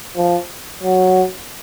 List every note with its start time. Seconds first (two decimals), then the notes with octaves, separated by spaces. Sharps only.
0.16 F3
0.83 F#3